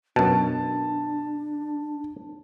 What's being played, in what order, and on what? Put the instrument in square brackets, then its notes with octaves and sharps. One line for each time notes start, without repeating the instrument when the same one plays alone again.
[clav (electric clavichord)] F#2 B2 [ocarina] D4 [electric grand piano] A5